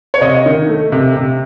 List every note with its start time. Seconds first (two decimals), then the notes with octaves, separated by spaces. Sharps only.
0.14 C#5
0.21 C3 D#5
0.46 D#3
0.69 A3
0.92 C3
1.16 C3